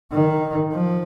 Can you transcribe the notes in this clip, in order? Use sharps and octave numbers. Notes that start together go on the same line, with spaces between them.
D#3
F3